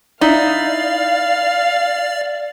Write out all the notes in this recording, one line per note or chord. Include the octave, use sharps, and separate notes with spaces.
D#4 E4 D5 F5